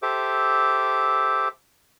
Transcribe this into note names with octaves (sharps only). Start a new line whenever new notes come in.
G4 A4 C5 E5 D6